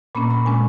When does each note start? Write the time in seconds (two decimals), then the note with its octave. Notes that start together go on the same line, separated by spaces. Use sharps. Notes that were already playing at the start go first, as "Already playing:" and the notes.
0.15 A#2 A#3 C#4 B5
0.30 B5
0.46 A#2 G#3 C#4 G#5